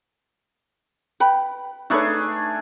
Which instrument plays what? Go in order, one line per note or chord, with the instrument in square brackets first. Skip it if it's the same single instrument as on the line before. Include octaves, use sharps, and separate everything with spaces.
[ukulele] B4 G5 B5
[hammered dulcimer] A3 D4 G#4 [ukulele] D#4 B4 C#5